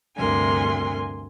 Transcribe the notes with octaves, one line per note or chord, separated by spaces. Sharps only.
D2 G2 C3 A#4 G#5 C6